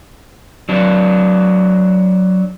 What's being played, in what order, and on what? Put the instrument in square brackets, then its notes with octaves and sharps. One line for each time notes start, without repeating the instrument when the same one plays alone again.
[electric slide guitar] F#3 D4